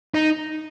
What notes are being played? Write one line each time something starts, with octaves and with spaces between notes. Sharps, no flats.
D#4